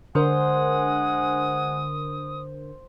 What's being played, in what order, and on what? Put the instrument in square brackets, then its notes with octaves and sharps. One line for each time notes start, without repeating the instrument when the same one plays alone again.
[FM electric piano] D3 D4 A#4 [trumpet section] G#3 F#5 G#5 [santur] C5 [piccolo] D#6